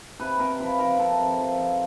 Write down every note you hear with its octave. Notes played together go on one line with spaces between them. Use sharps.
C3 B4
C3 A#4
F3 B4
F3 A#4
C3 A4
C3
F3
F3